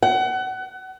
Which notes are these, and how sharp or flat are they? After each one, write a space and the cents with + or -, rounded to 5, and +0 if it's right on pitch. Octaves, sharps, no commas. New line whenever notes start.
F#5 +30